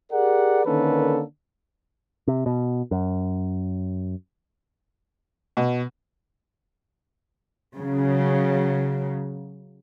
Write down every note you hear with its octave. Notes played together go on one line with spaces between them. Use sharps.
G4 G#4 A#4 D5 F#5
D3 D#3 A#3 C#4 A4 B4
C3
B2
F#2
B2
C#3 F#3